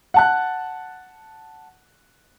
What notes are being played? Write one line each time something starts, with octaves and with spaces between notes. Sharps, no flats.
F#5 A5 F#6